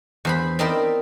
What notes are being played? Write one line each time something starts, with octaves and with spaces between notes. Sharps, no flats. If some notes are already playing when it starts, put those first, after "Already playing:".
E2 C5 B5
C4 D#4 E4 A#4 D5 B5